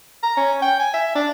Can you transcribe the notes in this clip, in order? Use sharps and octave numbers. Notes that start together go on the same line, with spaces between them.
A#5
C#4
G5
G#5
E5
D4